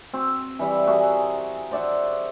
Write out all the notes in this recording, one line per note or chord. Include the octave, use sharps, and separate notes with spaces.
C4 F#4
E3 G3 E5
F#4 G#4 A#4 E5
C5 D5 E5 F#5